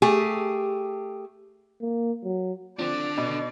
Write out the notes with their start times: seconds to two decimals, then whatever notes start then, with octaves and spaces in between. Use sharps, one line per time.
0.02 A3 G4 G#4
1.81 A#3
2.24 F#3
2.79 D3 F3 C4 D4 D5
3.17 B2 D#5